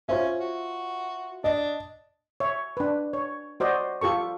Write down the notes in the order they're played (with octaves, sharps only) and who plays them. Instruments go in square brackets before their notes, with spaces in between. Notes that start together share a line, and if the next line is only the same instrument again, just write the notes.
[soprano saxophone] C#4 [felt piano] F4 C5 E5
[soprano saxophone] F#4
[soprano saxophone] D4 [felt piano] D#5
[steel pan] C#5 E5
D4 B4
C#5
F#4 C5 D5 D#5
F4 G4 A4 C#6